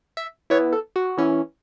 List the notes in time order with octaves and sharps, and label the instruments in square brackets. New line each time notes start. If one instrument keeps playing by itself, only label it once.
[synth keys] E5
E3 B3 E4 C#5
A4
F#4
E3 C#4 E4